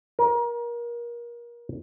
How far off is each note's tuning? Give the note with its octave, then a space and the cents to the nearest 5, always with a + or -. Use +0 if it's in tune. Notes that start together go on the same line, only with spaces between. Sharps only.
A#4 +30